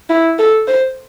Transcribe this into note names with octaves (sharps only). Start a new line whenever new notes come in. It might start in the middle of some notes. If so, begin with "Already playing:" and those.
E4
A4
C5